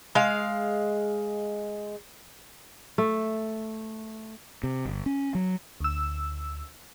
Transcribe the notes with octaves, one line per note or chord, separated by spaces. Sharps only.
G#3 F5
A3
C3
G1
C#4
F#3
D2 E6